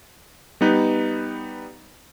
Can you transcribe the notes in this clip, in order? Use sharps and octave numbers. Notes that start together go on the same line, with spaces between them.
G3 B3 D#4 B4